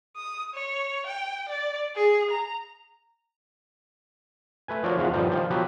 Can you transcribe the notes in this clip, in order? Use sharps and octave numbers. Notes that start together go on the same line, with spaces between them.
D#6
C#5
G5
D5
G#4
A#5
A3 B4 G#5
F3 D4 F#4 A#4 C#5
E2 G#2 F3 F#4 F5
G2 A#2 D3 D#3 F3 G3
D#3 F3 G3
F3 F#3 B3 G4 B4